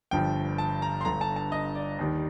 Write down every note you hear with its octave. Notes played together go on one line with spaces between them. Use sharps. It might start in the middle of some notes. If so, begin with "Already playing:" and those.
G1 G2 F3 G5
A5
A#5
C6
G1 G2 D3 A#5
A5
A5
D#5
D5
D#2 D#3 G3